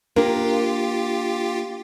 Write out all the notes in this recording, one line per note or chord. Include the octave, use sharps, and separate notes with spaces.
A#3 D4 F4 G4 A#4